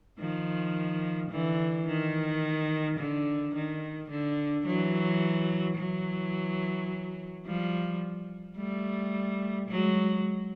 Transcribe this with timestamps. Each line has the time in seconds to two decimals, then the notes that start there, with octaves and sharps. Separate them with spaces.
0.19 D#3 F3
1.30 D3 E3
1.87 D#3
2.99 D3
3.55 D#3
4.10 D3
4.66 E3 F#3
5.78 E3 F#3
7.46 F3 G3
8.57 G3 A3
9.69 F#3 G#3